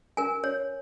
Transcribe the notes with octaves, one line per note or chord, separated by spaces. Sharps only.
A#4 G#5
C#5